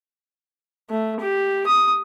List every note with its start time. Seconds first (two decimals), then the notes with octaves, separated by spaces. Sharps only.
0.90 A3
1.20 G4
1.67 D#6